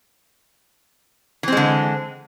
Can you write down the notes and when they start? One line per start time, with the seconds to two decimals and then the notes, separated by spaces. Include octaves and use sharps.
1.43 E3
1.48 C4
1.52 G#3
1.57 D3